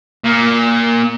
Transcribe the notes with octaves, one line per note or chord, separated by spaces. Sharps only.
A#2